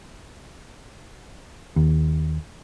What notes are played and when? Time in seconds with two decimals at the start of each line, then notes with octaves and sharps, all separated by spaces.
1.76 D#2